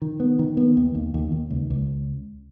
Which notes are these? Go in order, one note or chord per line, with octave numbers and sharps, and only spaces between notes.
D#3
B3
D#3
B3
D#2
D#2
D#2
D#2
C#2
C#2